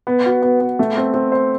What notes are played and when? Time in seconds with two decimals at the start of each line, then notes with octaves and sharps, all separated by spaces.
0.07 B3
0.26 F#4
0.42 B3
0.60 B3
0.79 A3
0.97 C4
1.14 C4
1.32 C5